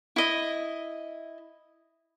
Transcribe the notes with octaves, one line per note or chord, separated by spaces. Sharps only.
E4 D#5